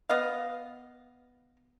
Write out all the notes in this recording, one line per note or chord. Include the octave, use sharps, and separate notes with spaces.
B3 D#5 F5